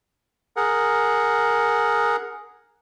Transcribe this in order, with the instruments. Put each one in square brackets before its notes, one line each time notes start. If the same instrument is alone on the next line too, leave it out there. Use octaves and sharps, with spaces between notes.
[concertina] G#4 A#4 F#5